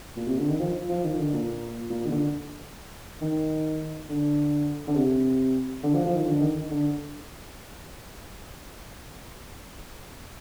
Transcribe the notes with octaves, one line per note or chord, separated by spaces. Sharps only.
A#2
C3
D3
D#3
F3
F3
D#3
D3
A#2
A#2
D#3
D3
D#3
D3
D3
C3
D3
F3
F3
D#3
D3
D#3
D3